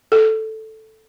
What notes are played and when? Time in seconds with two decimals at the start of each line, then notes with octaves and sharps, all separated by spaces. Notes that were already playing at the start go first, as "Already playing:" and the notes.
0.12 A4